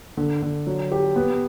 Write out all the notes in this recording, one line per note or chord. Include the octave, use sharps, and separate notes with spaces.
D3
D3
F#3
G4
B3